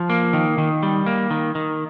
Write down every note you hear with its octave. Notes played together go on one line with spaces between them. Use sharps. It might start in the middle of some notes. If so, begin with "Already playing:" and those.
Already playing: F3
A#3
D#3
D#3
G3
A#3
D#3
D#3